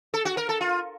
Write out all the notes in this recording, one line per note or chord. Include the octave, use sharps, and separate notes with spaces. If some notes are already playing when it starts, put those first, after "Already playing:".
A4
F#4
A#4
A4
F4